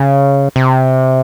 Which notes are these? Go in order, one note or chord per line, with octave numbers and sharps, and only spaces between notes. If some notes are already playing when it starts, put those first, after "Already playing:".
Already playing: C#3
C3